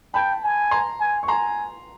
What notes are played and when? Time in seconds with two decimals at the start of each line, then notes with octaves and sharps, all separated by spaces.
0.14 G5 A5 B5
0.43 G#5
0.71 A#5 C6
1.00 G#5
1.23 C#6
1.28 G#5 A#5 C6